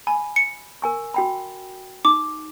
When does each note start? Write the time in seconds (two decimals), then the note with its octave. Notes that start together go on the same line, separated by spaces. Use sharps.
0.07 G#5 B5
0.36 C#7
0.82 A#4 G#5 C#6
1.14 F#4 G5 B5
2.05 D#4 D6